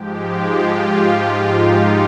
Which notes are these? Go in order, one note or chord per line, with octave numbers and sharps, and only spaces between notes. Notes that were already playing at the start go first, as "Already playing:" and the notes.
Already playing: G#2 F3 G#3 G4
F4
D#4